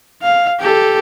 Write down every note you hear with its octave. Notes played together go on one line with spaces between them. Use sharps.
F5
G4 A4